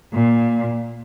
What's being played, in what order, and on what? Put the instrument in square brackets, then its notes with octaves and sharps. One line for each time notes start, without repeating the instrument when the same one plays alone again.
[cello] A#2